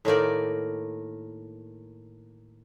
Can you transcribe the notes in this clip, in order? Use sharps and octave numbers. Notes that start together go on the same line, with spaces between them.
A2 D#3 A#3 D5